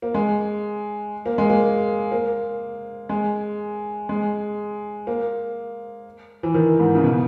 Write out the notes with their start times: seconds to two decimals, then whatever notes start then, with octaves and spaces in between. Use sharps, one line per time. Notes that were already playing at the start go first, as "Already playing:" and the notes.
0.02 A#3
0.14 G#3
1.26 A#3
1.38 G#3
1.50 A#3
2.12 A#3
3.09 G#3
4.09 G#3
5.07 A#3
6.43 E3
6.54 D#3
6.80 G#2
6.95 C#3
7.04 B2